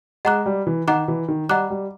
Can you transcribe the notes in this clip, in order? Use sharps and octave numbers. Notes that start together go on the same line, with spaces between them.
G#3 D#5 F#5 A#5 D6 F#6
G3
E3
D#3 D#5 F#5 A#5 D6 F#6
E3
D#3
G3 D#5 F#5 A#5 D6 F#6
G3